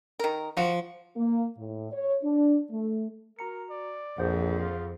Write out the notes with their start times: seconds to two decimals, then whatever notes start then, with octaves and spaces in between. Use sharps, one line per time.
0.19 D#3 A#4
0.57 F3 F4 F#4
1.17 A#3
1.57 A2
1.91 C#5
2.23 D4
2.70 A3
3.39 F#4 A#4 A#5 C#7
3.70 D5
4.18 A#1 F2 G#4 C5 F#5
4.61 F4